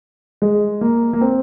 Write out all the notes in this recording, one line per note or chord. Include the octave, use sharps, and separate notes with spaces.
G#3
A#3
A#3
C4